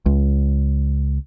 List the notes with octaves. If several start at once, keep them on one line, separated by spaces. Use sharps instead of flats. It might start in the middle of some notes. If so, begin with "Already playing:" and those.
C#2